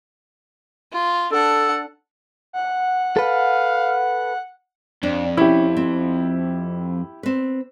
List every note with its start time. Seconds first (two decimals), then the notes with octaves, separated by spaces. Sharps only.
0.92 F4
1.32 D4 A4 F#5
2.53 F#5
3.17 A4 B4 F5
5.03 F2 D4
5.37 C#4 E4 G4
5.77 C4
7.23 C4 B4